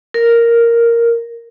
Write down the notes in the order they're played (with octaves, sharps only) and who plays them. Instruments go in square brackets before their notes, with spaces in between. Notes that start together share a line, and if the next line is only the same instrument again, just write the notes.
[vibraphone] A#4